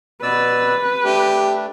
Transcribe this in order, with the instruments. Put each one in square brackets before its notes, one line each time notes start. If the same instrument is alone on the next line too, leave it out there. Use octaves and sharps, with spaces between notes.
[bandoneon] B2 D5 E6 [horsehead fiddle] B4
[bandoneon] A3 D4 [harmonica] G4